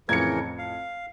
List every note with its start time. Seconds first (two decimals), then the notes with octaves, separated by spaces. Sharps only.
0.09 F2 A2 C#3 E3 A#4 G#6 C#7
0.58 F5